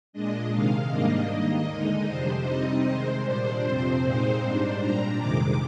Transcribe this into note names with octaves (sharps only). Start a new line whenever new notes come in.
A#2 G#3 D4 D#5
C3 D#3 G#3 F5
G#2 G3 A#3 D4 D#5
D#2 D#3 A#3
D3 G#3 D#4
F2 C3 G3 D4 C5
C3 G3 C4 D#4 D#5
C3 D#3 G#3 C5
A#2 G3 D4 C5
F2 C3 F3 C4 C5
A#2 G#3 C4 D#4
G#2 G3 D4
A#2 G3 D4 A#5
F2 C3 D#3 G#3 D6